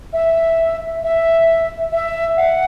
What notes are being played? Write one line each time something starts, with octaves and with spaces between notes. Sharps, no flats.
E5
E5
E5
F#5